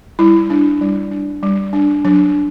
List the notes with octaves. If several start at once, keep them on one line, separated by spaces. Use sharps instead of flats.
G3 E4
D4
G3
D4
G3
D4
F#3 D4